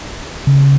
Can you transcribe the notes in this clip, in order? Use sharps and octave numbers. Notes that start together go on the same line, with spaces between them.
C#3